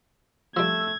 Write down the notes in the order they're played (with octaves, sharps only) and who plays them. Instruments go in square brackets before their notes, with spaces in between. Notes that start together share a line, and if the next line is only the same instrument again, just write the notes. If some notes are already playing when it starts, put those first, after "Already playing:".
[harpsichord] F3 G3 [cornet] A3 [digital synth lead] E6 [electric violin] G#6